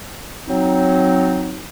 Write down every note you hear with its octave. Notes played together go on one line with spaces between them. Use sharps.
F#3 C4 D#4